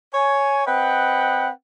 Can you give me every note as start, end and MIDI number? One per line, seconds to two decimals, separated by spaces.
0.14 0.65 73
0.14 0.65 80
0.66 1.50 60
0.66 1.50 71
0.66 1.50 75
0.66 1.50 78
0.66 1.50 79